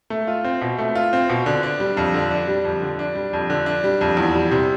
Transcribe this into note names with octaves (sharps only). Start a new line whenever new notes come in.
A3
F4
C4
B2
A3
F4
C4
B2
D3
D4
G3
F2
D3
D4
G3
F2
D3
D4
G3
F2
D3
D4
G3
F2
E2
G3
C3